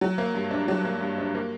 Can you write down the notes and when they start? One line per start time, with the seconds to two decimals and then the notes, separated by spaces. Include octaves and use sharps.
0.01 F#3
0.18 A#3
0.35 G2
0.51 D4
0.68 F#3
0.85 A#3
1.01 G2
1.18 D4
1.35 A#3